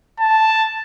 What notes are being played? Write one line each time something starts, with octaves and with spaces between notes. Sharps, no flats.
A5